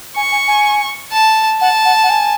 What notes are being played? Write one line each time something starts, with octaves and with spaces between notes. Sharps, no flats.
G#5 C#6
G#5
G#5
A5
F#5 A5
F#5
F#5
G#5